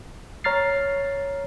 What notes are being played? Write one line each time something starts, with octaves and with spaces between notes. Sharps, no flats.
C#5 A#5 F6 A6 C7